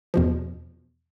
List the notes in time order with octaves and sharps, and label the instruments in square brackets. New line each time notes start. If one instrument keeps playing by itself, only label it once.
[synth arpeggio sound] E2 B2 F3